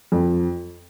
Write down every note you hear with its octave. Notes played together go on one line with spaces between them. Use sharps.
F2